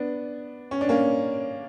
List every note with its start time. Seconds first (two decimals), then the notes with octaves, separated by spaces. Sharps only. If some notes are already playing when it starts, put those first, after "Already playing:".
Already playing: B3 D4
0.71 C#4
0.81 D4
0.89 A#3 C#4